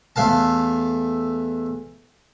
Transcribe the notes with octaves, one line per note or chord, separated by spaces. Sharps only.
E2 A3 F5 A5